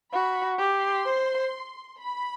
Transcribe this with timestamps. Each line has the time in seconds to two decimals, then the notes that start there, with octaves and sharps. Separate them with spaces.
0.13 F#4 B5
0.59 G4
0.75 C6
1.06 C5
1.99 B5